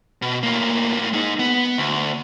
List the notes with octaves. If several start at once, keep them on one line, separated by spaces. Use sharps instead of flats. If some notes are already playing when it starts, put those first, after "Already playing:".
B2
A2 A#3
G#3 D#4
B3
D2